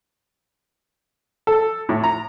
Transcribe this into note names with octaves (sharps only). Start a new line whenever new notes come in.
A4
A2
A#5